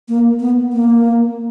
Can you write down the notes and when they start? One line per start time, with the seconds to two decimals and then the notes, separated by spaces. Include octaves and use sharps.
0.09 A#3
0.40 B3
0.73 A#3